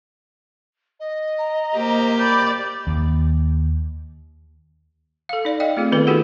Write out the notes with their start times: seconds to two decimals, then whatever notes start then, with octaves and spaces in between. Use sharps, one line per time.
1.00 D#5
1.39 A#5
1.75 A#3 G4 C5
2.19 D5 B5 G6
2.87 D#2
5.29 A4 F5
5.45 D#4 D5
5.60 D#5 F5 G5
5.77 A3 C4 F4 G#4
5.92 D#3 B3 C4 F4 A4 B4
6.07 D#4 F#4 G#4 A4 B4 F#5